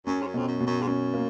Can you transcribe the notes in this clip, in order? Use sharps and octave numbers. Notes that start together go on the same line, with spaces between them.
F#2 C#4
G#2
F#2
F2 B2
F#2
B2
F#2
G#2
F#2 C#4
A#3